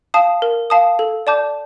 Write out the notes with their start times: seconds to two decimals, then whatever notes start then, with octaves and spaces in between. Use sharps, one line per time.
0.14 F5 A5 D#6
0.42 A#4
0.70 F5 A5 D#6
0.99 A4
1.27 D5 A5 D6 G6